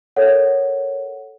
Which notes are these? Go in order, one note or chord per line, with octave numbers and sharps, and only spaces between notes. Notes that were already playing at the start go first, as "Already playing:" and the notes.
A4 A#4 C#5 F#5